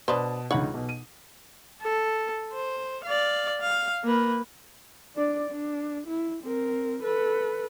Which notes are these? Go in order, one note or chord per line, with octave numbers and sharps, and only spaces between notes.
B2 D4 B4 C5 A5 D#6
C#2 D3 D#4 C#5 F#5 B5
B1 B2
D#7
A4
C5
D5 F5
F5
A#3 B4
D4 D5
D4
E4
C4 A#4
A4 B4